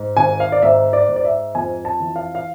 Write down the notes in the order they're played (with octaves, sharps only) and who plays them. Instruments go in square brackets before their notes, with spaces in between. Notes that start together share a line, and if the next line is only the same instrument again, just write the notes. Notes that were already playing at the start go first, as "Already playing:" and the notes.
Already playing: [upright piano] G#2
G#1 G#5
F5
D5
G#2 E5
D5
G#2
D5
E5
F2 G#5
A5
E3
F5
F5